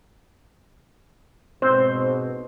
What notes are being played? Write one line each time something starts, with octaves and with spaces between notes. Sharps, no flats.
G#2 B2 C4 C5